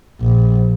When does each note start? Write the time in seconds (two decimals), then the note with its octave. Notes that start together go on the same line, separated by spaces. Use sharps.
0.21 A#1